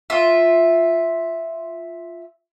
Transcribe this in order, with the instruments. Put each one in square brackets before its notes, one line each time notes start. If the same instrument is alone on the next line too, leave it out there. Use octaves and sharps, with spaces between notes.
[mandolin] F4 E5